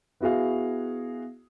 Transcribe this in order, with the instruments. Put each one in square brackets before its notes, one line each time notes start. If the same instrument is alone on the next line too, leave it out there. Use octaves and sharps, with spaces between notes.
[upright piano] B3 E4 F#4 G#4 F5